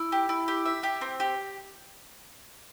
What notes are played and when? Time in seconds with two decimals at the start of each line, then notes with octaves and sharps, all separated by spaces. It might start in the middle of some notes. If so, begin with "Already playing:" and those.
Already playing: E4
0.12 G4
0.29 E4
0.48 G4
0.66 E5
0.83 G4
1.01 C4
1.20 G4